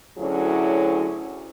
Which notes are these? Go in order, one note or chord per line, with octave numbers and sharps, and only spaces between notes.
D2 F#3 C#4 E4 G#4